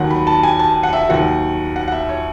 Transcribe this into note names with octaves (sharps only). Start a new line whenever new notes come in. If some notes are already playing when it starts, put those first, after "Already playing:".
Already playing: D#2 D#3 F#3 F#5
B5
A5
G#5
A5
F#5
E5
D#2 D#3 F#3 F#5
F#5
F#5
E5
C#5